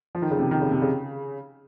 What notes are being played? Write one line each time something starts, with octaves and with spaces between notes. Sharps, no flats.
F3
D#3
C#3
C3 D#3
D#3
C#3
C3
C#3